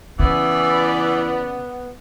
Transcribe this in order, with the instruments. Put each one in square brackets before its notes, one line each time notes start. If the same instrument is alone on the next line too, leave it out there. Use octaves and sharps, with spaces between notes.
[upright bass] C#3 [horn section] E3 [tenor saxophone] B3 [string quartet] D5 B5